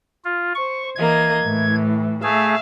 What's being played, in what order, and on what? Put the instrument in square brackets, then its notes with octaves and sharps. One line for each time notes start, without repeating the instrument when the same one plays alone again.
[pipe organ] F4
[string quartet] C5 [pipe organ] C#6
[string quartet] E3 A#3 D#5 [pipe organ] G#6
[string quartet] A2 E3
[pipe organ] A3 G#4 [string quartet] E5 F5